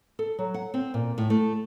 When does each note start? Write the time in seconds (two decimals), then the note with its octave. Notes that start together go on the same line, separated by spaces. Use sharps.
0.19 A4
0.39 F#3
0.54 F#5
0.74 C4
0.94 A#2
1.18 A2
1.30 A3